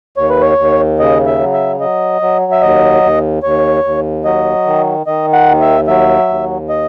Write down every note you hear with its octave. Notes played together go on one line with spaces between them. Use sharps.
D#2 C#5
B4
C#5
D#2
C#3 D#5
E5
F#3
E5
F#3 D#5
F#3
E5
D#2 D#5
D#2
D#2 C#5
D#2
F#3 D#5
D#3
D#3 D#5
F#5
D#2
E5
F#3 E5
D#2
D#5